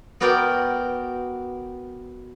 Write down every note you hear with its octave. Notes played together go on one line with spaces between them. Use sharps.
B3 F#4 A#4 D5 G5